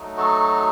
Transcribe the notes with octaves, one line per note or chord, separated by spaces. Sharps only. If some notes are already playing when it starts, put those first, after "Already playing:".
Already playing: F#3 A3 D#4
F#4 A4